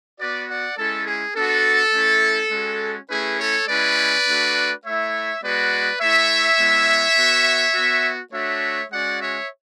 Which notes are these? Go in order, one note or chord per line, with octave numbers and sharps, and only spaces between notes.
B3 F#4 B4 D5
D5 F#5
G#3 C#4 E4 A4
G#4
B3 D4 F#4 A4
A3 C#4 E4
G#3 C#4 F#4
A3 C#4 E4 G#4 B4
A4 C#5
G#3 C#4 E4 B4 D5
A3 D4 F#4
A3 E4 C#5 E5
G#3 B3 F#4 B4 D5
A3 E4 C#5 E5
G#3 B3 E4
B3 F#4
B3 F#4
A3 D4 F#4 C#5 E5
G#3 C#4 F#4 D5 F#5
C#5 E5